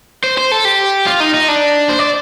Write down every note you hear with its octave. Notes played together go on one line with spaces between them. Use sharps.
C5
C5
A4
G4
F4
D#4
D#4
D4
C5
D5